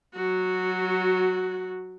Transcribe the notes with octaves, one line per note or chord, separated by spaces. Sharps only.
F#3 F#4